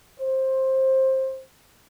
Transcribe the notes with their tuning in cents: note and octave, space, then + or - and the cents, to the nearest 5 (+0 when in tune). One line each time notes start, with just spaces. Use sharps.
C5 +15